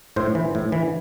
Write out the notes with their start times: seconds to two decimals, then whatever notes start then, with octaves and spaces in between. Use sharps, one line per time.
0.16 A2 C5
0.35 E3
0.55 A2
0.72 E3